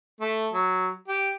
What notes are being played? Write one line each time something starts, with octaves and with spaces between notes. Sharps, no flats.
A3
F#3
G4